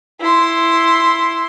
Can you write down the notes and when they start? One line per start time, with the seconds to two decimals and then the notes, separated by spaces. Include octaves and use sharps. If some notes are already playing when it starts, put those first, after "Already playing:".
0.20 E4 C6